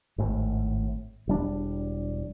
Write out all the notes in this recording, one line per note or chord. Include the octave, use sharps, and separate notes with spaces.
G#1 A2
E1 G3 D4